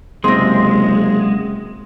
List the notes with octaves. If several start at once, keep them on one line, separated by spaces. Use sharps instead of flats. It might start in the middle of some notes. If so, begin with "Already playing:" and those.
F#1 C3 G#3 C4 C6 A#6